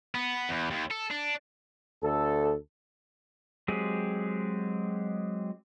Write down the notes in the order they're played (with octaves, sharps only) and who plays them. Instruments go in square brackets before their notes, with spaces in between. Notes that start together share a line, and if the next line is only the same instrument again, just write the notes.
[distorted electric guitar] B3
E2
D#2
A4
D4
[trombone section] D2 A4
[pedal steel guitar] F#3 G#3 C4 G4 G#4